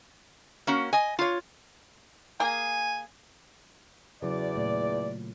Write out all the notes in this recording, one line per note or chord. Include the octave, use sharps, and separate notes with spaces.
A#3 C#4 F#4
D#5 G#5
F4 C#5
A#3 G#4 G#5
E2 C#3 F#3 E4 D5
A#2 A3